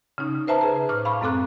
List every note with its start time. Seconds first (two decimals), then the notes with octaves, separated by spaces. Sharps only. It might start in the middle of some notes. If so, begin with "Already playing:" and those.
0.18 C#3 C#4 D#4
0.47 B4 C5 E5 A5 A#5
0.61 C#3 G#4 B4
0.89 A2 D6 F6
1.05 F5 B5 C#6
1.21 F#2 G#3 C4 A4 D6 F#6